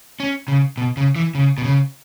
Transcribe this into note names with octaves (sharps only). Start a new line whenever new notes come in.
C#4
C#3
B2
C#3
E3
C#3
B2
C#3